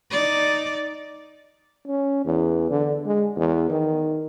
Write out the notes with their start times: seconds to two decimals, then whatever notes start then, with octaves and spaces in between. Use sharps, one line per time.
0.11 D#4 D5
1.88 C#4
2.25 E2
2.71 D3
3.05 G#3
3.36 E2
3.70 D#3